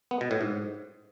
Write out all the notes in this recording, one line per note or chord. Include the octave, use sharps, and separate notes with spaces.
B3
B2
A2
G#2